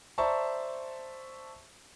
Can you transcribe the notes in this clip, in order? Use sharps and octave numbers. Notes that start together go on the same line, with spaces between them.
C5 D5 E5 A5 A#5 C#6